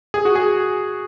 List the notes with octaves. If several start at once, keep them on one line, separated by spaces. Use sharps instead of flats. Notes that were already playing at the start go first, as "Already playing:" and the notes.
G#4
F#4
G#4